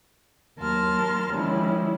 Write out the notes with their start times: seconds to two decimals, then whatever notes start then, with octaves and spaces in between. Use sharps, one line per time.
0.59 D#2 F#3 A#4 A5 C6 F6
1.32 D#3 F3 G3 G#3 C#4 E4